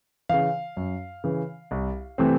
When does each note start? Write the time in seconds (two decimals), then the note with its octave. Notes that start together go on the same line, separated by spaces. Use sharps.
0.29 C#3 E3 F5
0.77 F#2
1.24 C#3 E3
1.71 C2
2.18 C3 E3 A3 C4